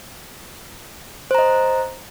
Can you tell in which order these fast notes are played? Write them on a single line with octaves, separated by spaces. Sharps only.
C5 A#5 D#5